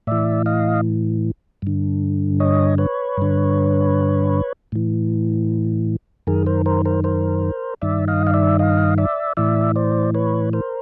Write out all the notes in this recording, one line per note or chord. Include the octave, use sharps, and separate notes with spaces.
A2 E3 D5 E5
D#5 F5
G2 D3
C#5 D#5
B4 C#5
G2 D3
A2 E3
F#2 D#3 G#4 A#4
A#4 C5
A#4 C5
A#4 C5
A#4 C5
G2 D#3 D5 E5
D#5 F5
F5
D5 E5
D#5 F5
D5 E5
A2 E3 D5 E5
C5 D5
B4 C#5
A#4 C5